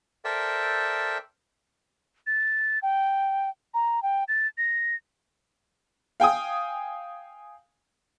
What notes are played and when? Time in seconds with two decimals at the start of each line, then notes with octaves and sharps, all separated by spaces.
0.25 A4 A#4 C5 D5 E5 G5
2.27 A6
2.82 G5
3.74 A#5
4.03 G5
4.28 A6
4.58 A#6
6.20 F5 G5 G#5 D#6